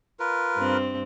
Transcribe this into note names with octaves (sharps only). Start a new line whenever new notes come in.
F4 A#4 B4
G2 C4